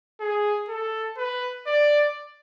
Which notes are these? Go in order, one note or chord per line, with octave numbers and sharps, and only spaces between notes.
G#4
A4
B4
D5